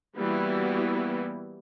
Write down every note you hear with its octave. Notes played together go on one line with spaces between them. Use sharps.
E3 G3 A#3 B3 E4 F#4